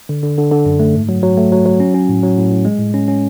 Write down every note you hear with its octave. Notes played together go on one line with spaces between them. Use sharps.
D3
D3
D3
D3
F#2
A3
G#2
F#3
F#3
A3
F#3
F#3
C#4
C#4
A2
F#3
A2
A2
G#3
A2
C#4
C#4